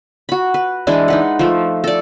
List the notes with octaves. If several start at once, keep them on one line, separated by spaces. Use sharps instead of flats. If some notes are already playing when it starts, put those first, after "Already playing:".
F#4 B5
B4
E3 G#3 D4 E4
D#4 B4 F#5
F3 A3
A4 D5